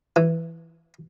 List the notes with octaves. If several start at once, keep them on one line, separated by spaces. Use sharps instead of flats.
E3